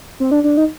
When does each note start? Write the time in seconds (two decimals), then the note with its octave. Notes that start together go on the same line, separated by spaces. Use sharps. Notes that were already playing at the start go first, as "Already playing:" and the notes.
0.20 C4
0.31 D4
0.44 D4
0.57 D#4